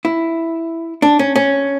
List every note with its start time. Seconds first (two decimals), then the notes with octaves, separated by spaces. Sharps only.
0.05 E4
1.02 D4
1.19 C#4
1.36 C#4